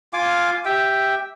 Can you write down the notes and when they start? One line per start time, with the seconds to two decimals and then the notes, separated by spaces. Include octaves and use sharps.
0.13 F4 F5 G#5 D6
0.65 G4 E5 G5